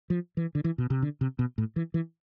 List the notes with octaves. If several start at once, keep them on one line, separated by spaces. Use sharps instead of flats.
F3
E3
D3
E3
B2
C3
D3
C3
B2
A2
E3
E3